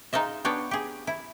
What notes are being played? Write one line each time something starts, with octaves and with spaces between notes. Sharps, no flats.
G#3 D#4 F4 D#5 E5
B3 D4 C#5 G5
G4 G#4
E4